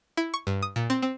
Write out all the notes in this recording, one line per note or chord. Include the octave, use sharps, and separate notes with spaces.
E4
C#6
G2
D#6
A#2
C4
C4